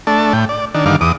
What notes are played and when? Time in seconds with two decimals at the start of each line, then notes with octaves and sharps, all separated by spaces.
0.07 A3 D4 A5
0.33 A2 G5
0.49 D5
0.74 D#3 D4
0.86 G2 D3 D#3 F5 D6
1.01 E2 D6 D#6